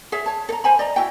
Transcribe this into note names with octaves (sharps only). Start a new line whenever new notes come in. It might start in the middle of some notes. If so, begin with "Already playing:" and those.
G#4 C#5 E5
C#5 A5
A4 A#5
C5 G#5 B5
D5 D#5 A#5
E4 F#4 G5